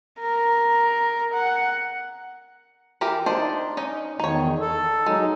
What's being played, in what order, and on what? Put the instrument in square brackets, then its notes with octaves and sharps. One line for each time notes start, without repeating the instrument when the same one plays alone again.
[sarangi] A#4
F#5
[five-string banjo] E3 G4 A#4
D4 D#4 C5
C#4 D#4 D#5
[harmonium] E2 D#3 [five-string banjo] D#4 C#5
[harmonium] A4
[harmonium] F#3 D#4 [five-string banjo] G#3